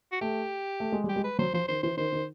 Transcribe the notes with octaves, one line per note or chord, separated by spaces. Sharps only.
F#4
A3 G4
A3
G#3
G3
G4
G#3
B4
F#3 C5
F3 C5
D#3 C5
E3 C5
D#3 C5
D#3